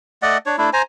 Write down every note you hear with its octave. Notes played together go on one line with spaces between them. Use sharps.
A3 D5 D#5 F#5
D4 C#5
A3 D4 E4
C5 G#5 A#5